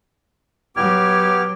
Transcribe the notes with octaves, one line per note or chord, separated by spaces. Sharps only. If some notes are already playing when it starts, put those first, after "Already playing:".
F#3 B3 G4 D6 F6 G#6